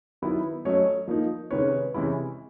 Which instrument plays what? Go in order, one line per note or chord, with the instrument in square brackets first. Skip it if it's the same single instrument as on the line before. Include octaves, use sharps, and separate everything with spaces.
[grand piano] D#3 F#3 B3 E4
F#3 A3 C#4 C#5 D#5
F3 A#3 D#4
C3 D#3 G#3 C#4 B4 C#5
C3 E3 G#3 C#4 E4